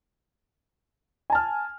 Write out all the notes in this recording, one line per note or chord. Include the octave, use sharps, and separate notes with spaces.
G#5 A5 F6